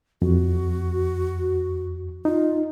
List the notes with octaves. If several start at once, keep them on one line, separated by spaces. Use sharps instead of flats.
F2 F#4
D#4 F4